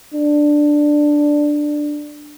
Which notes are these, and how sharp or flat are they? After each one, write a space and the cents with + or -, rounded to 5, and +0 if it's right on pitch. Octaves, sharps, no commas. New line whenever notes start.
D4 +5